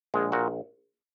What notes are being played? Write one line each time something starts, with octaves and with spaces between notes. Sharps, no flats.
A#1 G#3
A#2 F#4